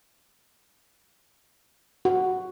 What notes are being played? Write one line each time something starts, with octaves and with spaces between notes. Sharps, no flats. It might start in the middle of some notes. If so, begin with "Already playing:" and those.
F#4